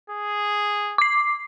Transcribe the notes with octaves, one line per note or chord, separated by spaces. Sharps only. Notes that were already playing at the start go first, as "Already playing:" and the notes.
G#4
D6 C7